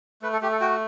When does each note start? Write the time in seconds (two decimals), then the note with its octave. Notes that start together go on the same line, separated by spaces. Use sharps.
0.22 A3 B4
0.33 A4
0.41 A3 G4
0.52 A4
0.61 F#4 G5